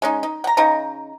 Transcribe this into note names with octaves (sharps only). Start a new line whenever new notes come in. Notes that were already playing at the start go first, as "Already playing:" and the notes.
G#3 C#4 D#4
D#4
F#5 A#5
C#3 D#4 D#5 A#5